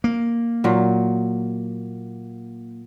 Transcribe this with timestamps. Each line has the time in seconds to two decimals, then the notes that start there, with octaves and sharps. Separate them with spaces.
0.04 A#3
0.64 A#2 F#3